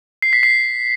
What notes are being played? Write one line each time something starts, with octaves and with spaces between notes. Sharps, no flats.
C7
B6
C7